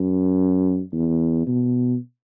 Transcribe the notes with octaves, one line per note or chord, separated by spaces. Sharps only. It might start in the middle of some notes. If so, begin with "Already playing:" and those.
Already playing: F#2
E2
B2